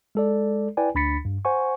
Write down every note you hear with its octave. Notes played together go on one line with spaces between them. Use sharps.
G#3 A4 D5
E4 B4 D5 G5 G#5
D2 D4 B5 A6 B6 C#7
G2
C5 F#5 G#5 C#6